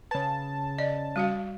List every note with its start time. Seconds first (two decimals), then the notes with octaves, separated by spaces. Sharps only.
0.11 C#3 B4 A5
0.78 D5 D#5
1.16 G3 F#4 F5